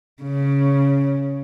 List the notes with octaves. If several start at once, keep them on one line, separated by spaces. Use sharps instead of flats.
C#3